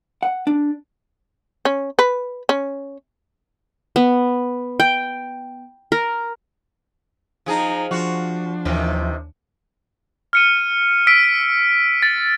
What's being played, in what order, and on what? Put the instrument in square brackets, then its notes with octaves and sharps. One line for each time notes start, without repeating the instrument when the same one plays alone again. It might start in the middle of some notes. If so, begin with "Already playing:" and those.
[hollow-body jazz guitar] F#5
D4
[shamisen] C#4
B4
C#4
[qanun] B3
G5
A#4
[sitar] F3 G#4 [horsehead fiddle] D#4 A#5
[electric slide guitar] F3 [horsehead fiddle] D4 [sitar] F#4
[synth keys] D#2 [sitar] C3 D#3 E3
[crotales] F6 C#7 D#7
E6 B6 D7
A6